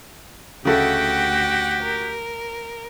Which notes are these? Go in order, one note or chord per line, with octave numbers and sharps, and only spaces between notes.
D2 C#3 A3 F#4 G4 F#5 G5
A#4